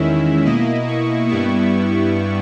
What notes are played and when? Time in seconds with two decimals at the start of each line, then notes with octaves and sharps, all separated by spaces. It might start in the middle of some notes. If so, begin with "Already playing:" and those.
Already playing: E2 D#3 G#3 C#4 E4 E5
0.45 B2 A#3 E4 D#5
0.87 C#6
1.29 G2 G3 B3 E4 C#6